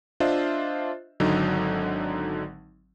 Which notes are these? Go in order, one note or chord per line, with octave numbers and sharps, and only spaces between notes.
D4 F4 C5 D#5 E5
G#1 D3 F#3 D#4